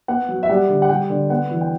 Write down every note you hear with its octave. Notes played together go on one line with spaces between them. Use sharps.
B3 F#5
F#3
E5
G3 F#5
D3
F#5
G3 G5
D3
B3 F#5
E3
G5